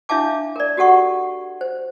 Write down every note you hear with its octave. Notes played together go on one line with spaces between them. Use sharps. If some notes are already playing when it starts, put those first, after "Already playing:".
D4 E4 E5 F5 A5 D6
A#4 D5
F#4 G4 A4 F#5 C#6
C5